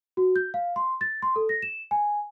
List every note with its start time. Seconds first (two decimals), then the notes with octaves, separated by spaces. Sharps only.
0.17 F#4
0.36 G6
0.54 F5
0.76 C6
1.01 A6
1.23 C6
1.36 A4
1.49 A#6
1.62 E7
1.91 G#5